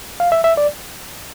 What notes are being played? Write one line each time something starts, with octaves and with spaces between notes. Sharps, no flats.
F5
E5
E5
D5